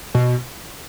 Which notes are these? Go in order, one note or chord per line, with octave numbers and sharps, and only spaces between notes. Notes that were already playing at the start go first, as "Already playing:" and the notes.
B2